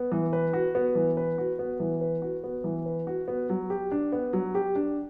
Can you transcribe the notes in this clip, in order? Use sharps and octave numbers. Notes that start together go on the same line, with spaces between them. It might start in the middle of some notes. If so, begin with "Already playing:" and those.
Already playing: B3
E3
B4
F#4
B3
E3
B4
F#4
B3
E3
B4
F#4
B3
E3
B4
F#4
B3
F#3
G4
D4
B3
F#3
G4
D4